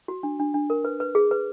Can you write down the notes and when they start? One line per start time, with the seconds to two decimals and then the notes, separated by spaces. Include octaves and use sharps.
0.08 F#4
0.23 D4
0.40 D4
0.54 D4
0.70 A#4
0.85 B4
1.00 B4
1.15 G#4
1.31 B4